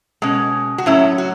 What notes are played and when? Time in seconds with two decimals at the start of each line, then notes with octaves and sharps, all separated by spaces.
0.22 B2 G#3 C#4
0.78 F#4
0.86 A2 F#3 C#4 E4
1.18 F#4